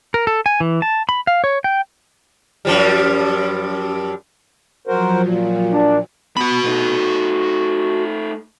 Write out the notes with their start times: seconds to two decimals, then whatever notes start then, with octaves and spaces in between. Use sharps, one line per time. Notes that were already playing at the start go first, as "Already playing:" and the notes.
0.14 A#4
0.27 A4
0.46 G#5
0.60 E3
0.82 A5
1.09 B5
1.27 F5
1.44 C#5
1.64 G5
2.65 F#2 F3 G3
4.87 F3 F#3 F#4 A#4 C5
5.23 A#2
5.72 D4
6.37 B2 B3 F#4 B5
6.65 A3 D#4